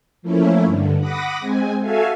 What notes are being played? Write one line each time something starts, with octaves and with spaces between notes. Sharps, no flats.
F3 A3 A#3 C#4 E4
G2 D3
F#5 B5 D6 D#6 A#6
G#3 C4 G#5
F#4 A4 E5 F5 G#5